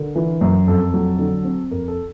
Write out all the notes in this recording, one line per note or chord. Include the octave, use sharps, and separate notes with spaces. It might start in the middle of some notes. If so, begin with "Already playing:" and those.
Already playing: D3 A#4
E3
F#2
F2 A4
F#3
D3
C4
F2 A#4
A4